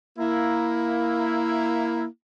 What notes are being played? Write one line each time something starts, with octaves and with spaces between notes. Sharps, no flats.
A#3 E4